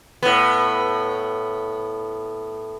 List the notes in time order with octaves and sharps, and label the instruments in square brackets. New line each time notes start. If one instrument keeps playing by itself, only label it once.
[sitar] A2 B3